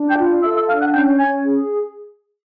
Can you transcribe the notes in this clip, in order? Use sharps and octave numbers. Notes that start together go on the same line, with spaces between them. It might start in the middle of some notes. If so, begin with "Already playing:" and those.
Already playing: D4
G5 G6
F4
A4 E5 E6
E5 E6
D4 F5 F6
F#5 F#6
C#4 G5 G6
C#4 G#5 G#6
G#4